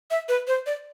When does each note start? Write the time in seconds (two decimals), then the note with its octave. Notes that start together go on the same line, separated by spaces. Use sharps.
0.11 E5
0.29 B4
0.47 C5
0.66 D5